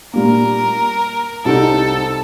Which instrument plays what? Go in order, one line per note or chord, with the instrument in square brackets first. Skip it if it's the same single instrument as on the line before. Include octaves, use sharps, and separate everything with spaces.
[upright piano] A#2 G3 A#3 [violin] A#4
[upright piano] C2 C3 G3 C4 D#4 [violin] A4